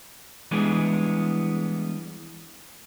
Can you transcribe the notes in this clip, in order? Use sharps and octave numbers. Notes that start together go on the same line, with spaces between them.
E3 G3 G#3 B3 D4 G#4